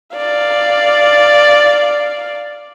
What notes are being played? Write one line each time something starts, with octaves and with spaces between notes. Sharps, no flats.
D5 F5